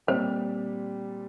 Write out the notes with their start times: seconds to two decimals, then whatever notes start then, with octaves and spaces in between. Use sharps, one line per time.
0.07 A#2 G3 C4 G4 C5